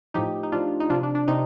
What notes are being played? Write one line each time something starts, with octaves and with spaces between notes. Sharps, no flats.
A2 F3 D#4 G4
D#4
A2 F3 D4 F4
D#4
C3 F3 D4 F4
D4
D4
C3 C4 D#4